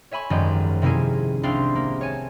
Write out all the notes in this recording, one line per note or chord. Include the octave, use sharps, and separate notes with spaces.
C#5 E5 G#5 B5 C#6
G#1 F#2 F3 G3 G#3
C3 A#3 C#4 E4 G#4
C2 C4 D4 F5 C6
A#3
C#5 G#5 A5